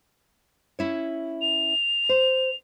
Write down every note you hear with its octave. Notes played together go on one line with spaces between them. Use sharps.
C#4 E4 C#5
F7
C5